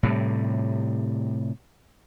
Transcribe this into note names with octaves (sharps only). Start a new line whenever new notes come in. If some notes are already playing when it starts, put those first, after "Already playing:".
A2 C3 G3